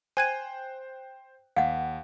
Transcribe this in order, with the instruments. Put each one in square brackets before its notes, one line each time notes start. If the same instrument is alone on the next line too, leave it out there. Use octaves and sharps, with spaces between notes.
[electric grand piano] C5 G5 F#6 [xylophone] G#5 G#6 D#7
[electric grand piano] D#2 [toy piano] F5 F#5